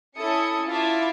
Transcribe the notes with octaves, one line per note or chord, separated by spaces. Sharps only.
C#4 E4 A4 D#6 C#7
E4 F4 E5 F5 A5 D6